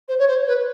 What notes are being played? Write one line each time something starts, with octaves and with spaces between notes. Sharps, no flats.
C5
C#5
C5
B4